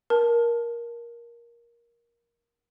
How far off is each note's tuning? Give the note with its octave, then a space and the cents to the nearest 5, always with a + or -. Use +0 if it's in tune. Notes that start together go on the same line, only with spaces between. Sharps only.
A#4 +15 A5 +0